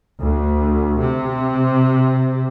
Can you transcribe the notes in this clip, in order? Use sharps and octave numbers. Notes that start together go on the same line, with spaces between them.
D2
C3